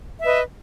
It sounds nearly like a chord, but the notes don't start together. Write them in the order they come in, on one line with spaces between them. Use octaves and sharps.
E5 D#5 B4